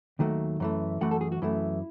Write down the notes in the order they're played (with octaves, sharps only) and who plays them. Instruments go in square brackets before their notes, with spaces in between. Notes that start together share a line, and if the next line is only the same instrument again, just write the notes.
[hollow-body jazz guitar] D#2 D#3 F#3 A3
F#2 E3 A3
F#2 E3 A3 F#5
A4
G#4
F#4
F#2 E3 A3 E4